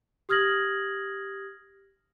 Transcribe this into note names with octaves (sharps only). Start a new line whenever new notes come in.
G4 D#6 F6 G#6 A#6 F#7